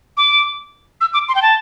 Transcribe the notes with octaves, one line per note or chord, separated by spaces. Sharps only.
D6
E6
D6
C6
G5
A5